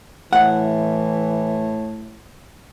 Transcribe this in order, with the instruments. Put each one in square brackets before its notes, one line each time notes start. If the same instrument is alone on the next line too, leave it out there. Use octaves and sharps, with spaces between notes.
[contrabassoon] A2 [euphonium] E3 [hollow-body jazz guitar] F#5